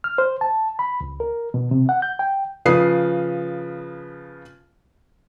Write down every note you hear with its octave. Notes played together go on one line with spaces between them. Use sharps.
F6
C5
A5
B5
C#2
A#4
B2
C3
F#5
G6
G5
C#3 F3 B4 D#6 C7